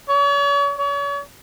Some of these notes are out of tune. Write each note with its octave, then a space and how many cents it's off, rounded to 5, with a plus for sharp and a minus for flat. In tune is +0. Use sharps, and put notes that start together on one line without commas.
C#5 +40
C#5 +40